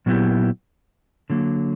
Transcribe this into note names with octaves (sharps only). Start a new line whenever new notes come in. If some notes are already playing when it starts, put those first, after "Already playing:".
A#2 F#3 B3 E4 G4
D3 F#3 A#3